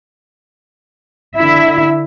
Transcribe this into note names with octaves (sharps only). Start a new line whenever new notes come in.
D3 E4 E5